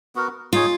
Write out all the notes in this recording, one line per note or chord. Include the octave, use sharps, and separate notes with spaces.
B3 F#4 A#4
D#4 F4 G#4 C#5